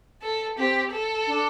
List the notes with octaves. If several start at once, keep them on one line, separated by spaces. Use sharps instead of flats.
A4
C4 G4
A4
D4